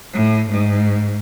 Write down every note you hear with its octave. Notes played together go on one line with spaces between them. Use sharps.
A2
G#2